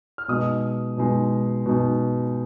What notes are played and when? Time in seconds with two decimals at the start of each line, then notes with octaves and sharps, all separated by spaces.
0.18 F6
0.28 B2 G#3 D#4 D#5 D#6
0.97 B2 G#3 D#4
1.66 B2 G#3 D#4